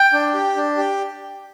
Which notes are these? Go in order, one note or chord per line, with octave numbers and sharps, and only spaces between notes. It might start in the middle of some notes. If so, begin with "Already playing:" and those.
Already playing: G5
D4
G4
D4
G4